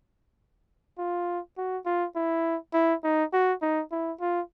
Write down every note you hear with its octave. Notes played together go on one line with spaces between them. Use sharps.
F4
F#4
F4
E4
E4
D#4
F#4
D#4
E4
F4